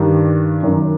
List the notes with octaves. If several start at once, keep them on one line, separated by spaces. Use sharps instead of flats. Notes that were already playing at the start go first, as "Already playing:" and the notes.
Already playing: G2 D#3 D4
F#2 D#3